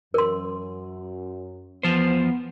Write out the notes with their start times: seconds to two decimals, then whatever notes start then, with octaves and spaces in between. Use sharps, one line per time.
0.14 F#2 A#4 C6
1.83 E2 F3 B3 C5